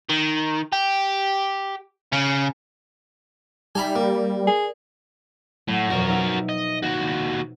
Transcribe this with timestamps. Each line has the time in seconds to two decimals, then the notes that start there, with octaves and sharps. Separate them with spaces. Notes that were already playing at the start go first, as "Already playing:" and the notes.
0.10 D#3
0.73 G4
2.13 C#3
3.75 G3 D#4 E5 G5 G#5 A#5 B5
3.96 A#3 A#4 D5
4.47 G#4
5.68 A2 F#3 E7
5.90 E1 F2 B2 F#4 A#4
6.08 D#4 E5
6.49 D#5
6.83 D#2 F#4